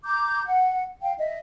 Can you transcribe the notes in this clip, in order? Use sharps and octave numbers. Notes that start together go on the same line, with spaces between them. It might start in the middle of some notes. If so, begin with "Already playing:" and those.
A#5 D6 G6
F#5
F5 G5
D#5 E5